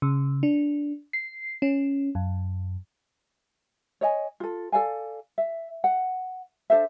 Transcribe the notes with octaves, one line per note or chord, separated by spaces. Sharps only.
C#3
D4
C7
C#4
F#2
C#5 D#5 G#5
F4 A4
A4 D5 F5 G#5
E5
F#5
D4 A4 C5 E5